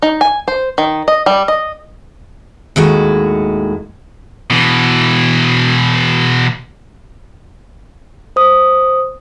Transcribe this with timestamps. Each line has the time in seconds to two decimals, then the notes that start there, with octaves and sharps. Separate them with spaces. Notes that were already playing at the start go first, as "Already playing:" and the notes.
0.02 D#4
0.21 G#5
0.48 C5
0.78 D#3
1.08 D#5
1.26 G3
1.48 D#5
2.76 D#2 A2 G#3 F#4
4.50 B2 E3
8.36 C5 D#6